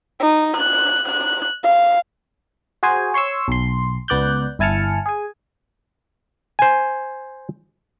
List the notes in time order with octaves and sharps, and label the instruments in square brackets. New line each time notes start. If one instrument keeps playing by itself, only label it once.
[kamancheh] D#4
F#6
F#6
F5
[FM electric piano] F#4 G#4 C5 G#5
C#5 C6 C#6 E6
B1 C6
C#2 B3 D5 F#6 G6
G1 E4 G#5 A5 F6 C#7
G#4 G#5
[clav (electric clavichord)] C5 G#5